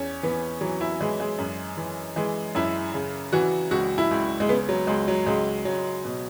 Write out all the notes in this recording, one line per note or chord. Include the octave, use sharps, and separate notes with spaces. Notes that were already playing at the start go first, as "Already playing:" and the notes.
Already playing: E2 C#4
E3 B3
E3 F#3
E4
E3 G#3
G#3
F#2
E3
E3 G#3
F#2 E4
C#3
E3 F#4
C#2 F#4
E4
C#2
G#3
C#3 B3
F#3
C#2 G#3
F#3
C#2 G#3
C#2 F#3
B2